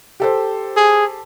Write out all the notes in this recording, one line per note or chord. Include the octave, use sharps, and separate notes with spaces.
G4 A4 C5
G#4